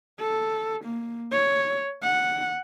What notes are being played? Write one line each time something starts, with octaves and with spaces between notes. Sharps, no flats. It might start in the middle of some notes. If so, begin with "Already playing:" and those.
A4
A#3
C#5
F#5